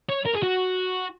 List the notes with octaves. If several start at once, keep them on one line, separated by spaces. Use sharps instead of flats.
C#5
A#4
G#4
F#4